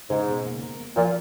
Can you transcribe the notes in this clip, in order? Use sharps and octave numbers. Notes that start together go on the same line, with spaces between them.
G#2 C#3
B2
A#3
A#4
A#3
A#2 F3